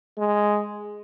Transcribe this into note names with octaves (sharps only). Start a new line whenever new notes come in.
G#3